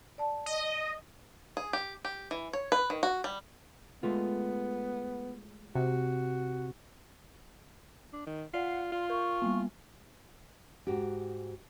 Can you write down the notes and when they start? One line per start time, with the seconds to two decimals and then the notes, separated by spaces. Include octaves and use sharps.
0.18 D5 A5
0.46 D#5
1.57 G#4
1.73 G4
2.05 G4
2.31 E3
2.53 C#5
2.72 B4
2.90 D#3
3.03 F#4
3.24 G3
4.03 G#3 A3 B3 F4
5.75 C3 F#4
8.13 D4
8.27 D#3
8.54 F4 D5 F#5 C7
8.92 F4 C6
9.10 A#4 C#6
9.42 G3 A#3 B3
10.87 G#2 F#4 G4